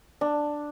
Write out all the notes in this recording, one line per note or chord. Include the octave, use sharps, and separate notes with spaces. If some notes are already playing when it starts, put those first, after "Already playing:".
D4